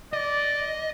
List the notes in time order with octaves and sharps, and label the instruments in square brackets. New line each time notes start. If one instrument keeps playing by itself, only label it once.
[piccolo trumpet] D5 [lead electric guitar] D#5